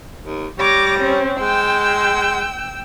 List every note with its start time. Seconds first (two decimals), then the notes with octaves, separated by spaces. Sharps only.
0.21 D#2
0.58 G3 C#5 D6 A#6
0.99 C4 C#4
1.40 G#3 G5 E6 G6